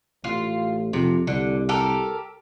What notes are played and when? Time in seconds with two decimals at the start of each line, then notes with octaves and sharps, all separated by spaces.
0.24 A1 F4
0.93 F2 C3
1.27 C2 D3
1.69 G4 A4 A#4